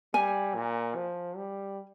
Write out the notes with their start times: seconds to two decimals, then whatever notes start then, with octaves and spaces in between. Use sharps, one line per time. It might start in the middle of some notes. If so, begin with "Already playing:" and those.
0.14 G3 G#5
0.55 A#2
0.96 F3
1.37 G3